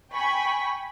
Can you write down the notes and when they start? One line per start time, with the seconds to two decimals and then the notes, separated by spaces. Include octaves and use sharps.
0.12 G5 G#5 B5 C#6